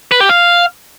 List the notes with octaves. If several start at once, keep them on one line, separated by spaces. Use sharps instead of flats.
B4
G4
F5